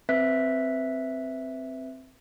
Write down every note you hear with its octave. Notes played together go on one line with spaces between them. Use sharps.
C4 B4 E5 F#6 B6